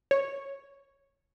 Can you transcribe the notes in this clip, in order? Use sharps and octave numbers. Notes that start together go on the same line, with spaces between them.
C#5